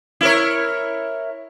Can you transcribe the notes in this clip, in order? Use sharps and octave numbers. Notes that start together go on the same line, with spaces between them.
E4 A#4 C#5